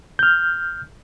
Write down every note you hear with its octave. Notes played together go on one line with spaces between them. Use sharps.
F6 G6